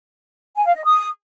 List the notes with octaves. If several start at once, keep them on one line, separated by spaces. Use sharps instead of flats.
G#5
F5
D#5
D#6